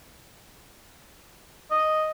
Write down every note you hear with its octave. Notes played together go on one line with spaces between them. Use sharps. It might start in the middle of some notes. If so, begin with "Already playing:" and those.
D#5